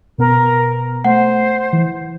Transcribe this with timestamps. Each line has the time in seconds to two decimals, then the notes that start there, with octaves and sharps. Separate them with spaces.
0.18 B2 B3 A#4
1.04 A3 C5 F#5
1.73 E3